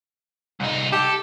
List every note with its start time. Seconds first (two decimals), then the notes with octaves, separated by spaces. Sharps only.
0.60 C2 D#4
0.92 G4 A4